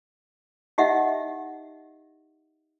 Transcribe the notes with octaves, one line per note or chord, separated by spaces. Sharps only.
D#4 G4 D#5 E5 F#5